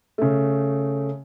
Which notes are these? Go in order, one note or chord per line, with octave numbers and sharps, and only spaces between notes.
C#3 A3